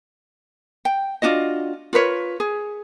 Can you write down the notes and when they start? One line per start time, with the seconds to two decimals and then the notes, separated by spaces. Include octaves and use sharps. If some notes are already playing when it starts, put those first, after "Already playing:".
0.85 G5
1.22 D4 F4 F#4 D#5
1.93 F4 A#4 B4 C#5
2.40 G#4